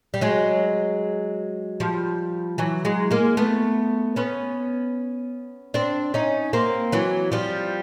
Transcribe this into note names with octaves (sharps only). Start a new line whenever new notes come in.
G3
F#3 G#3
F3 G3
E3 F#3
F#3 G#3
G#3 A#3
A3 B3
B3 C#4
C4 D4
C#4 D#4
A#3 C4
E3 F#3
F3 G3